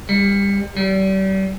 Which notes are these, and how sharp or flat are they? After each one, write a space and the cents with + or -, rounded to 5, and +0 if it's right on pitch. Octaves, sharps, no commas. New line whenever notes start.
G3 +25
G3 -35